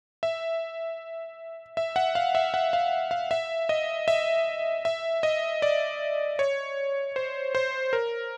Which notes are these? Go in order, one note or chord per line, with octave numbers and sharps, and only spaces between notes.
E5
E5
F#5
F5
E5
F#5
F5
F5
E5
D#5
E5
E5
D#5
D5
C#5
C5
C5
A#4